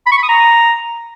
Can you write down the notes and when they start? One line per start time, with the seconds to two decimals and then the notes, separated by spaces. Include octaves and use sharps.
0.06 B5
0.12 C#6
0.18 B5
0.23 D#6
0.29 A#5